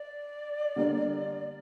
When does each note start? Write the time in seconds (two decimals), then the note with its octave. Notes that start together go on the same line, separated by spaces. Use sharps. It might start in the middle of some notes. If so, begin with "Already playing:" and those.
Already playing: D5
0.76 D3 G3 A#3 D4